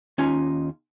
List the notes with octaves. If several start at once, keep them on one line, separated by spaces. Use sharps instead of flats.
D#2 C#4 D#4 F4 G#5